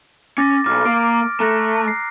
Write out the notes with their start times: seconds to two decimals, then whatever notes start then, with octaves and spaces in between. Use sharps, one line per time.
0.38 C#4 D6 A6 A#6
0.66 B1 G#2 D6 F6
0.86 A#3 D7
1.40 A3 A#5 F#6 A#6
1.88 C7